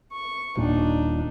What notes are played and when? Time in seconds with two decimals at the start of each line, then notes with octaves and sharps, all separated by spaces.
0.13 C#6
0.57 D#1 A#2 D4 D#4